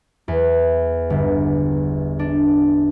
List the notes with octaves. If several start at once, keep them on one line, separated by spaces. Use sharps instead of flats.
E2
G1
D4